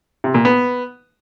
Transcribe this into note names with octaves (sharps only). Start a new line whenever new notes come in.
C3
A#2
B3